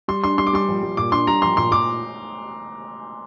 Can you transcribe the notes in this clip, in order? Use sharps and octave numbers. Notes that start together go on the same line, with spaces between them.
G3 C6
D4 C6
G3 C6
D6
G3 C6
A#1
G3
A#2 D6
D4 C6
G3 A#5
A#1 C6
A#2 C6
A#2 D6